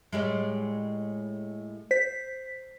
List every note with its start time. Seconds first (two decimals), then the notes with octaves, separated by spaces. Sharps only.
0.13 A2 G3 G#3
1.91 C5 B6